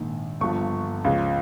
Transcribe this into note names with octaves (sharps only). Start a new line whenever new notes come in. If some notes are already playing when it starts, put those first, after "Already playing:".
Already playing: A#1 G#2 D#3
G1 G2 F3 C#6
C#2 C#3 F3